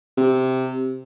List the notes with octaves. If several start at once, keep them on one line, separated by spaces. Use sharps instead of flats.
C3